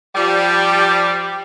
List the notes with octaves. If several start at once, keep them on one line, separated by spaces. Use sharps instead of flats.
F3 G3